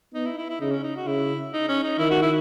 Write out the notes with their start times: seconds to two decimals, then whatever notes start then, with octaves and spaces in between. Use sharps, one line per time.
0.14 B3 D#4
0.25 E4
0.37 E4
0.49 E4
0.61 C#3 D#4
0.71 C#4
0.83 D#4
0.95 F#4
1.07 C#3 E4
1.53 D#4
1.68 C#4
1.84 D#4
1.99 D#3 E4
2.10 F#4
2.22 E4